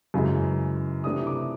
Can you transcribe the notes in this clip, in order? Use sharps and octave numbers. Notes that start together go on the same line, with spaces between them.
F#2 C#3 E3 G#3
C3 E3 A3 D4 D#6
D6